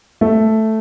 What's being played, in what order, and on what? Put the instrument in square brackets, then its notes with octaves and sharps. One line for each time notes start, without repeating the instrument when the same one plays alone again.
[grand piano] A3